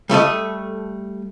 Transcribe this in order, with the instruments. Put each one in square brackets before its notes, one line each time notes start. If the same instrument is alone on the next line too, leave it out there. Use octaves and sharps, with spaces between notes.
[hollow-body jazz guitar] G3 A3 A4 D#5